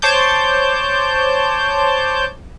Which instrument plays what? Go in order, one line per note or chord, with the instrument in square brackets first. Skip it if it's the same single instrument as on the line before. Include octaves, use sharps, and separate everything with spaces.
[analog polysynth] C5 C#5 A5 D6 G6